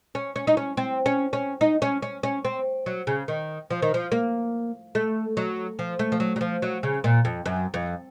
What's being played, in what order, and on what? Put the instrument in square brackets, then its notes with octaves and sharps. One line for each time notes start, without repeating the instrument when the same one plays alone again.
[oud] C#4
C#4
D#4
C#4
C4
C#4
C#4
D#4
C#4
C#4
C#4
C4
F#3
C#3
D#3
F3
D#3
F3
A#3
A3
F#3
F3
A3
F3
F#3
F#3
F3
F#3
C#3
A#2
F2
F#2
F2